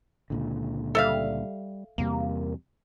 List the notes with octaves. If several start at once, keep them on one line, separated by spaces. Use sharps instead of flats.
C#2 A#2 D3
G3 A4 E5 F5
E2 C3 G3 A#3